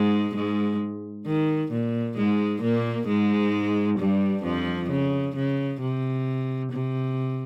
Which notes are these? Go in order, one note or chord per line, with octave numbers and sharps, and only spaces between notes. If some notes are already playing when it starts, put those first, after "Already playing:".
Already playing: G#2 G#3
G#2 G#3
D#3
A#2
G#2 G#3
A#2 A#3
G#2 G#3
G2 G3
F2 F3
C#3
C#3
C3
C3